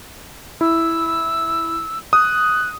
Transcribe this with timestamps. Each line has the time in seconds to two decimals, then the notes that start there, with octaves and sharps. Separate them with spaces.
0.61 E4 E6
2.13 D#6 F#6